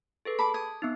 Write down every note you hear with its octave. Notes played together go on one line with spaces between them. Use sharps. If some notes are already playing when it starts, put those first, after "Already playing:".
G#4 A4 B4
A5 B5 D6
D#6 G#6
B3 C4 D#4